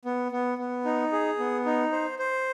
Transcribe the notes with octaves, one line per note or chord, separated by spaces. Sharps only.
B3
B3
B3
D#4
G#4
B3
D#4
C5
C5